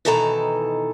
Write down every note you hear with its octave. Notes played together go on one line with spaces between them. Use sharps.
B2 D#3 E3 D#4 A4 A#5